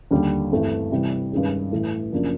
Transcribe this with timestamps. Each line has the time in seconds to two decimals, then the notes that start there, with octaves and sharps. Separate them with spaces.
0.11 D#2 D3 G3
0.51 G2 E3 A3 C4
0.92 C3 E3 G3
1.32 G2 D#3 G#3 C#4
1.72 A2 E3 A3
2.12 F#2 C#3 F3 A#3 D4